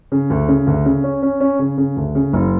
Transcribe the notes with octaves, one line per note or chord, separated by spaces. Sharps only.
C#3
D2
C#3
D2
C#3
C#4
C#4
C#4
C#3
C#3
D2
C#3
F#1